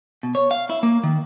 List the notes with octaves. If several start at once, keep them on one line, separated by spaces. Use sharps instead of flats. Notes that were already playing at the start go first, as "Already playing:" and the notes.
B2
C#5
F5
E4
A#3
D#3